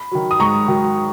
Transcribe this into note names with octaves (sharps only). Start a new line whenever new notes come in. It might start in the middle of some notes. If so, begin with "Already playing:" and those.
Already playing: B5
D#3 F#3
D#6
G#2 A#5 C#6
D#3 F#3